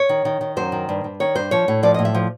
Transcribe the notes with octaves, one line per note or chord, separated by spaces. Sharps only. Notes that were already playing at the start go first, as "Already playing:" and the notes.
Already playing: C#5
D#3
D#3
D#3
F#2 C5
D#3
G2
G2
D#3 C#5
G2 C5
F3 C#5
A2
F3 D5
A2 D#5
E5
F3